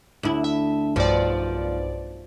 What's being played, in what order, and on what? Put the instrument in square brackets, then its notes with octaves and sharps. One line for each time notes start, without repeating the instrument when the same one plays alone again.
[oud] D2 E4
[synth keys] E5
[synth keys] B1 G2 D5 [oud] F3